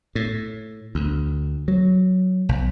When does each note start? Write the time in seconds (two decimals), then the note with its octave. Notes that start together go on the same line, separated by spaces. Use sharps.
0.15 A2
0.95 D2
1.68 F#3
2.49 B1